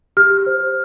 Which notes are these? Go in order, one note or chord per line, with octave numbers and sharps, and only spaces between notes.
G4 F6
C5